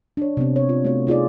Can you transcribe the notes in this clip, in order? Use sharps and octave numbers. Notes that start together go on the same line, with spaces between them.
D4 C#5
C3 B3 C4
C#5
F4
A3 B3 F#4 C#5
D#4 F4 G#4 D5